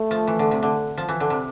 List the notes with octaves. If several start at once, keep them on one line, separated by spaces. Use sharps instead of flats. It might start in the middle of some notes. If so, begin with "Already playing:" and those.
Already playing: A3
F3
E3
D3
C3
D3
F3
E3
D3
C3